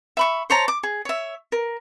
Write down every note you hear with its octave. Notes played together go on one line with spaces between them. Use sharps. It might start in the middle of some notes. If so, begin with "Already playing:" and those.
E5 B5 C#6
C5 C#5 A5 A#5
D6
G#4
C#5 E5
A#4